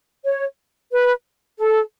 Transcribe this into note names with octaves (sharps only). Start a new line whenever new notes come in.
C#5
B4
A4